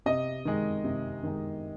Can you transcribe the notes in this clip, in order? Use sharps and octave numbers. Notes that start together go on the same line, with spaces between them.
C3 D#5
D#3 G#3
C3
D#3 G#3